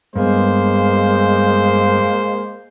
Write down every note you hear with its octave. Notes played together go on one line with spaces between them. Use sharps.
G2 G#3 A#3 B3 C5